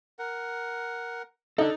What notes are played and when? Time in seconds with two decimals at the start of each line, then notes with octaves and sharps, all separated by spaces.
0.19 A#4 F#5
1.58 D4 D#4 A4